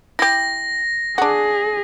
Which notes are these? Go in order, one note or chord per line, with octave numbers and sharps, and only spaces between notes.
E4 G4 A#6
D4 F#4 G#4